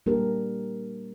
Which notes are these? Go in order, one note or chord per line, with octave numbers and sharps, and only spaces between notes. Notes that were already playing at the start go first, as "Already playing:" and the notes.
G3 A#3 D4 G4 A#4